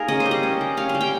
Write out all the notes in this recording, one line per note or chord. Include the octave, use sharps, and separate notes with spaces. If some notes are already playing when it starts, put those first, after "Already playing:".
Already playing: A#3 D#4 G#4 A#4
C#4 D#5
C5
G3
D#5
C#4
G3
C#4 F5
F5
G3
G5